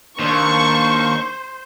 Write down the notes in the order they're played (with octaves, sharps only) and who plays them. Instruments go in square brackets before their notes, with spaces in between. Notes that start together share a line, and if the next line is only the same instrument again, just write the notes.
[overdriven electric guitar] D#2 [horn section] A#3 D4 [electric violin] C5 [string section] C#6